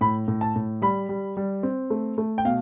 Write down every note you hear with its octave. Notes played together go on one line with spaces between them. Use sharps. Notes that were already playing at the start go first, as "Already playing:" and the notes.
A2 B5
A2
A5
A2
G3 B5
G3
G3
C4
A3
A3
G5
B2 F5